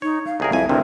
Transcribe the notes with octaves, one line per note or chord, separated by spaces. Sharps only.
D#4 C#5
F5
C2 G#4 A#4
C2 F2 E5 G#5
D2 G2 C3 A#4